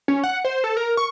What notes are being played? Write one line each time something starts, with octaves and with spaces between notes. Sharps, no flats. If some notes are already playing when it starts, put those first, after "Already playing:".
C#4
F#5
C5
A4
A#4
C#6